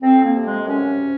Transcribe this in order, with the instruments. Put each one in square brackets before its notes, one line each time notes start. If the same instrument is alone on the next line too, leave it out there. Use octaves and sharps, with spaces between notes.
[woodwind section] F2 C4
A#3
C3
G#3
F#2 C#4